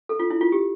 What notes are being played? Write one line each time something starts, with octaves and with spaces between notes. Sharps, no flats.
A4
F4
E4
F4
G4